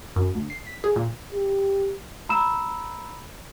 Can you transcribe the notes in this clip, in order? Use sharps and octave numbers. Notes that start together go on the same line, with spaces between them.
F#2
D2
C7
B6
G#4
A#2
G4
A#5 B5 E6 E7